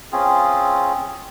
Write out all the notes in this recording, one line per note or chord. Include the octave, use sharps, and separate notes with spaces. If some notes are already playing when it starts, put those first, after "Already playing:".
C4 C#4 F4 G#4